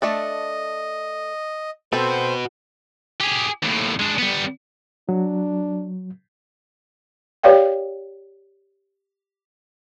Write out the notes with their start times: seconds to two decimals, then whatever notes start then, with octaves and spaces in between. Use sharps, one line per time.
0.02 A3 D4 A4 D#5
1.93 C4 F#4 A4 B4 C5
3.21 G4 G#4
3.63 D#2 A2
3.99 G#3 D4
4.18 G3 B3
5.09 F#3 D4
7.43 G4 B4 C#5 D5 F5 G5